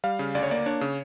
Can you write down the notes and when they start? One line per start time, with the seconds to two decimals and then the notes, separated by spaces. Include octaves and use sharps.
0.04 G3 F5
0.19 C#3
0.35 D2 D5
0.43 C#5
0.51 A#3 D5
0.66 D4 C#5
0.81 C#3